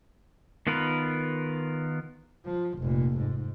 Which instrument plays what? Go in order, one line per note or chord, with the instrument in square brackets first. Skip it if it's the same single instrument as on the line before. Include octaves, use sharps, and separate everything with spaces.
[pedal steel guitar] D#3 B3 F4 A#4 B4
[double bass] F3
F1 A#2
G#2